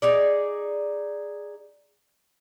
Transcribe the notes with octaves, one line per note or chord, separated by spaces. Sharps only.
D#4 G#4 D5